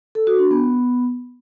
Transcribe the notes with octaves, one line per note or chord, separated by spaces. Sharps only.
A4
F#4
D4
B3